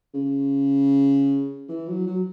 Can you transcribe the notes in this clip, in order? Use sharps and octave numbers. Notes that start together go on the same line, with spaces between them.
C#3
E3
F#3
F#3